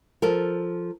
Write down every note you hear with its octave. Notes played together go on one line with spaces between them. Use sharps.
F3 A4 A#4